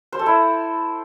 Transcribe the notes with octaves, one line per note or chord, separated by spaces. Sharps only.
C5
A4
E4